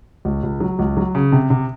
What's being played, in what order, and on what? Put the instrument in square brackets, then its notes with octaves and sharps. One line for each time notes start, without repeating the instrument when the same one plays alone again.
[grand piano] C#2
C#2
F#3
C#2
F#3
C#3
C3
C3